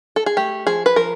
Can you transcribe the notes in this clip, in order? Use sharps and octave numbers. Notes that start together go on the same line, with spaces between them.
A4
G#4
A3 G4
F3 G#4
B4
F3 A#4